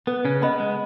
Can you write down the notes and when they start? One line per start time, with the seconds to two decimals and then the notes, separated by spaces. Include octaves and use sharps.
0.07 B3 B4
0.25 C#3 C#4
0.42 B3 D#5 F#5 B5
0.60 G#3